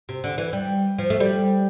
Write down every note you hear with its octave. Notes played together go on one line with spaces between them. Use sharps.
C3
D3
E3
G3
F3
A3
G3